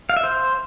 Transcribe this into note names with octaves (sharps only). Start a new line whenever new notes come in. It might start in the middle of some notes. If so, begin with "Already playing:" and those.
F5
E5
C5